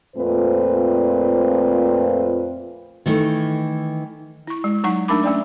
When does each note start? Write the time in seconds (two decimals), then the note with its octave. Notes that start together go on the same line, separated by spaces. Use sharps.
0.16 F2 A#2 A3 C4 F4 B4
3.06 D#3 E3 A3
4.47 E4 C#6
4.64 G#3
4.84 F#3 D#4 F#5 C#6
5.08 A3 D4 D#4 A#4 B5 D6
5.24 A3 C#4 D5